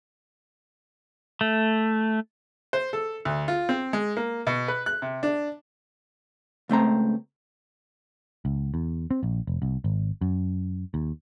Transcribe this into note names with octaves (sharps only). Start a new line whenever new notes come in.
A3
C5
A4
D2
F4
C4
G#3
A#3
B2
B4
F#6
C3
D4
C#2 A3 C4 A#5
C#2
E2
C4
A#1
F1
C2
G#1
F#2
D#2